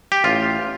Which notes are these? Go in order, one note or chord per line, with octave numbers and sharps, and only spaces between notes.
G4
A1 F4